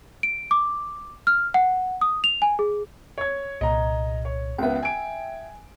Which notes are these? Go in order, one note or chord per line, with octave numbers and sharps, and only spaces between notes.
D7
D6
F6
F#5
D#6
F7
G#5
G#4
C#5 G#6
C2 A#2 D#5 A#5
C#5
C#2 B3 E5 G5
G#5 D7